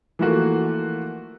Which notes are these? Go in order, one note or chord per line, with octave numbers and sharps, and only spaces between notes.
E3 F3 A3 A#3 F4 F#4